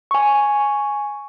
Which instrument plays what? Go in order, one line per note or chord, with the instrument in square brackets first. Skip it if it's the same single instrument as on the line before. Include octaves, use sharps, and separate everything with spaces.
[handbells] G#5 C#6